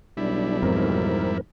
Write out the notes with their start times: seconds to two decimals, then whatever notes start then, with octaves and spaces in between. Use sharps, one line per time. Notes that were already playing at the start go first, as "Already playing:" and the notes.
0.17 B1 G3 D4 E4
0.62 F2 G#2 C4 A#4